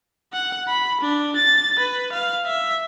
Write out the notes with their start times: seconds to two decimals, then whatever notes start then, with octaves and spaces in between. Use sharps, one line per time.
0.33 F#5
0.68 B5
1.01 D4
1.37 A6
1.80 B4
2.13 F5
2.46 E5